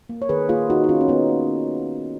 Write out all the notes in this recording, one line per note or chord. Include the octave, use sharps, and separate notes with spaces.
A#3
C#5
D#3 G#4 B4
A#3 F4 G#4
D#3 D#4 F#4
D#4
D#3 C#4 F4
C#4
D#3 B3 D#4
A#3